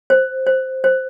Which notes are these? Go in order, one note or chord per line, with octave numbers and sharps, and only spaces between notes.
C5
C5
C5